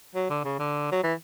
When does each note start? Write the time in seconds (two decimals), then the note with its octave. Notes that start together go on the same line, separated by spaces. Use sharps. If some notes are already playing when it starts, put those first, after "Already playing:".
0.15 F#3
0.30 D3
0.45 C#3
0.59 D3
0.92 F#3
1.03 E3